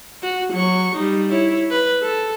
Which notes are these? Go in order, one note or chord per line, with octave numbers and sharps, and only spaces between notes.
F#4
F#3 C#6
G3 D#4
E4 C#5
B4
A4